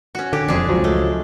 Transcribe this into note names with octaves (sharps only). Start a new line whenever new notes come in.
C#4 F#4
D3 G4
E1 F2 D4 G#4
C#2 F3 F#3
G#3 A3